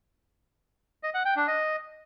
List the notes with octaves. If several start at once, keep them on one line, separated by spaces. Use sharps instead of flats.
D#5
F#5
G5
D4
D#5